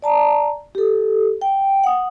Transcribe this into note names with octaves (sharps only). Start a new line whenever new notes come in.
D5 A5 A#5
G4 A4
G5
F#5 D#6